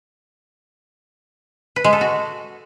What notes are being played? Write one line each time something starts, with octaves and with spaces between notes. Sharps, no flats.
B4
G#3
A4
F#4